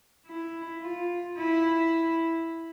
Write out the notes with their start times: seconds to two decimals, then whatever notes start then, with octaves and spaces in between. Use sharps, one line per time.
0.27 E4
0.82 F4
1.38 E4